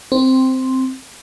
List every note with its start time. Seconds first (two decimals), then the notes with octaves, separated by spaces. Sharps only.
0.12 C4